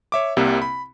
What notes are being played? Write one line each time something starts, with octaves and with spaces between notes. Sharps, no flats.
C#5 E5 D6
C2 C3 G3 A#3 C4
B5